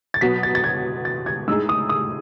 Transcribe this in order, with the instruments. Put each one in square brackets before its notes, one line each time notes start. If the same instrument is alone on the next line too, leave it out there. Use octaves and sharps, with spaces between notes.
[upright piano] A6
[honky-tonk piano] B2 F#3 B3 [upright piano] B6
[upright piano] A6
A6
G#6
A6
G#6
[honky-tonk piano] A2 G#3 D#4 G#4 [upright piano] E6
[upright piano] D#6
D#6